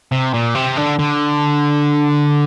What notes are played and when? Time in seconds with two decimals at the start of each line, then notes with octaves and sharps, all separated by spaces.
0.12 C3
0.34 A#2
0.55 C3
0.77 D3
0.99 D3